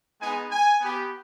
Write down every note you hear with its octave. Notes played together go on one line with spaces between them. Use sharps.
G#3 B3 D#4 G#5
G#5
B3 G4